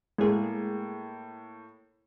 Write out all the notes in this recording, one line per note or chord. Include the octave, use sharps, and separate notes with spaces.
A2 G#3 A#3 G#4